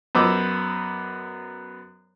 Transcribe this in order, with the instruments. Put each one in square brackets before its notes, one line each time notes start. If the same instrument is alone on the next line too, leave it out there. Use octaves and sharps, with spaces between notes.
[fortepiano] F#2 B3 C5 D#5 D6 E6